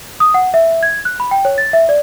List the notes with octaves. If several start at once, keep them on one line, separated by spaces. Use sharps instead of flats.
D#6
F#5
E5
G#6
F#6
B5
G5
C#5
A6
E5
D5